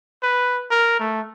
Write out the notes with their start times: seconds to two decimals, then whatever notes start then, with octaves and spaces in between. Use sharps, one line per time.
0.23 B4
0.71 A#4
0.99 A3